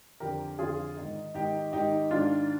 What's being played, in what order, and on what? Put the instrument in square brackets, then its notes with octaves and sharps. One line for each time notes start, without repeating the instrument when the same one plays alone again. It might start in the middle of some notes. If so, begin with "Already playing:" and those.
[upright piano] F2 D3 G4 A#4
F2 D3 F4 G#4
G#2 D#3 D#4
G#2 D#3 D#4 G4
G#2 D#3 D#4 G4
G#2 D#3 D4 F4